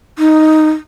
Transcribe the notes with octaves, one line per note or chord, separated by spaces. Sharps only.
D#4